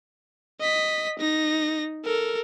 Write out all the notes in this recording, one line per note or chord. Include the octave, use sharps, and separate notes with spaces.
D#5 B6
D#4 A#6
A4 A#4